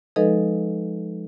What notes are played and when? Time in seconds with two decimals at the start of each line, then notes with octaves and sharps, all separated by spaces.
0.16 F3 G#3 D#4 A4 B4 D#5